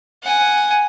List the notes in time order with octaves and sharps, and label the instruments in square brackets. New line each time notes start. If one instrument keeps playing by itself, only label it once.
[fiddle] F#5 G#5